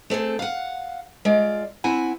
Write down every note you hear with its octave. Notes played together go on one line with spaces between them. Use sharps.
A3 C4 G#4 A4
F5 F#5
G#3 F4 D5
C4 E4 F#5 G#5